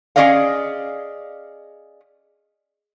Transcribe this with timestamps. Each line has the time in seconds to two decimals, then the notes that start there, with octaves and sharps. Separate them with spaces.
0.16 C#4 F#4 G#4 D5 D#5 F5